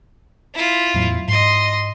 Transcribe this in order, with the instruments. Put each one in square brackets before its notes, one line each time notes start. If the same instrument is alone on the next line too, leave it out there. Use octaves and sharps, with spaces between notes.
[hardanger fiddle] E4 F4
[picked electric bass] E2 A2 F#3
[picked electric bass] G#2 [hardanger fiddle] D#5 C6